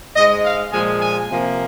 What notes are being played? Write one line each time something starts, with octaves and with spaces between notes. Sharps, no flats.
G#2 G#3 D#5
F5
A#2 F3 G#3 G#5
G#5
C3 F3 A#3